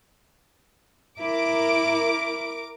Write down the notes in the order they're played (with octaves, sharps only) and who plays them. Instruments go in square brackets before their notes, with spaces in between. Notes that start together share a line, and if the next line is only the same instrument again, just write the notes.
[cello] E4 [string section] A#4 D6